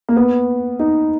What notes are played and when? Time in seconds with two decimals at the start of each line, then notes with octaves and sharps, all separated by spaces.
0.09 A#3
0.16 B3
0.79 D#4